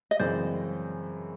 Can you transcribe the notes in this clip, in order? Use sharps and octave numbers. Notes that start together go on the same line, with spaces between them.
D#5
F#2 C#3 E3 G#3 C4 C5 D5